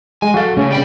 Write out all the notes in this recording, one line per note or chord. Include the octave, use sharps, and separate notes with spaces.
G#3 G#5
F#3 F#4 A4 F5
A2 C#3 A3 C#4
G3 G5 B5